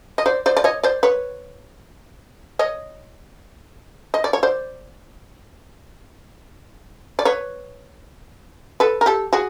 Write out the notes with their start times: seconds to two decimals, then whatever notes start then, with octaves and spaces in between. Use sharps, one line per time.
0.18 D#5
0.26 C5 D5
0.46 C5 D5
0.57 D5
0.64 C#5 D#5
0.83 C5 D5
1.03 B4 C#5
2.59 C#5 D#5
4.14 D#5
4.24 D5
4.33 C#5
4.43 C5 D5
7.19 D5
7.25 B4 C#5
8.80 A4 B4
9.01 A#4
9.06 G4 A4
9.33 F#4 G#4